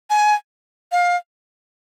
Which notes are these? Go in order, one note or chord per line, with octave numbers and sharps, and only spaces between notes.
G#5
F5